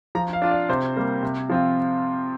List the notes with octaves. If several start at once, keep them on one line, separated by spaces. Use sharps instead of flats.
F3 A#5
F5
D4 F4
D5
C3 C5
G3 A#3
C3
F3 C4 F4